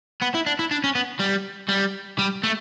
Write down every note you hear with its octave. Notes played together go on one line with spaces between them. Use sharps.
B3
E4
D4
E4
D4
C#4
B3
G3
G3
G3
A3